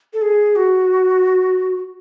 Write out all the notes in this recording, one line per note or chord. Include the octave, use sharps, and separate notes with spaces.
A4
G#4
F#4